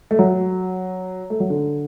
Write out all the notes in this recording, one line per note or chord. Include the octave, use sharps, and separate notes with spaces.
A3
F#3
A3
F#3
D3